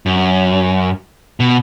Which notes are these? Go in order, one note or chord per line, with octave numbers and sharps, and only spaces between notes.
F#2
B2